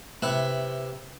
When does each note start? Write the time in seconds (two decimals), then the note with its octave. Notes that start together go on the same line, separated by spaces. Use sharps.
0.22 C3 E4 B4